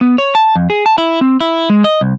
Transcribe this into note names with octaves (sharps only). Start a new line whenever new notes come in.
B3
C#5
A5
F2
G#4
A5
E4
C4
E4
G#3
D#5
C2